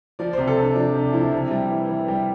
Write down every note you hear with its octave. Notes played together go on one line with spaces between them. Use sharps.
F3 D5
C3 C5
A4
C3 D4
F3 D4
C3 D4
F3 E4
C3
G3
E3
E3
G3